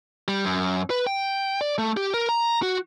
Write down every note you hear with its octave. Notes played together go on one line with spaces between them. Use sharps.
G3
F#2
B4
G5
D5
A3
G4
A#4
A#5
F#4